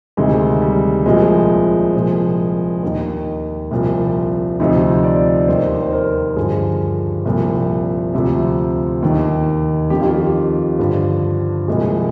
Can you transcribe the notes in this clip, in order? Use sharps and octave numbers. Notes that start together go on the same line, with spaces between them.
D2 C3 D#3 G#3
G3
C2 A#2 F3 G#3
C2 A#2 F3
D#2 D#3
C2 A#2 F3
D2 C3 F3 D#4
D5
D#2 D#3 C5
C5
A#4
G2 D3 F3 G#4
C2 A#2 F3
D2 C3 F3
D#2 D#3
F2 D#3 G4
F4
G4
G2 D3 F3
C2 A#2 F3 G#3